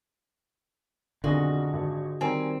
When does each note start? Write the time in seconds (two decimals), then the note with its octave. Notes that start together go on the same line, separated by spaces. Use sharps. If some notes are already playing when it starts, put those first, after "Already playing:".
1.24 B1 F2 D3 D#3 F4 F#4 G#4 D#5
1.73 G#1 A4
2.21 D#3 G3 C4 G#5 A#5